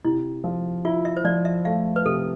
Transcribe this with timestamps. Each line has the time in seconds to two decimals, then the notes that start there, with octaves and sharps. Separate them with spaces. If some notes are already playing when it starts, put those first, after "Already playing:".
0.04 C3 E4
0.44 F3
0.85 E4 F4
1.05 E5
1.17 C5
1.24 F3 D5
1.45 E5
1.65 A3 F5
1.96 B4
2.05 C3 A4